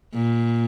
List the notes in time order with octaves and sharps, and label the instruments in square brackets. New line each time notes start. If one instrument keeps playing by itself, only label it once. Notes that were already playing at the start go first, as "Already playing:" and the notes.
[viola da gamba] A#2